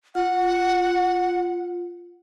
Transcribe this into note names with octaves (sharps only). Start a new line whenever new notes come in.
F4 F#5